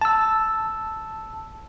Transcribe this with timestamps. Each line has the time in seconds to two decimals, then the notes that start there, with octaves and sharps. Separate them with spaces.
0.01 A5 E6